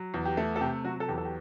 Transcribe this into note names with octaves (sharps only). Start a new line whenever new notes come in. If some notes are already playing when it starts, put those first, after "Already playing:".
Already playing: F#3
E2
G4
A3
A4
C3 G4
F#3 F#4
A4
E2 G4
A4
G4